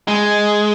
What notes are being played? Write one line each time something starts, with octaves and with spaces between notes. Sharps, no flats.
G#3